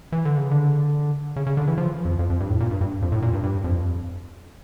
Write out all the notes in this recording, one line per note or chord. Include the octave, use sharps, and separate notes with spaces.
E3
D3
C#3
D3
C#3
C#3
D3
E3
F3
F2
F2
F2
G2
A2
A#2
G2
G2
F2
A2
A#2
G2
G2
F2